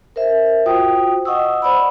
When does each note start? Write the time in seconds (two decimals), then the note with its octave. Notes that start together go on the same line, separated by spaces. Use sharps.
0.16 A#4 C5 E5
0.66 F4 F#4 C5 G5 D#6
1.25 D#5 F#5 C#6 D#6 E6
1.62 C5 D5 F#5 B5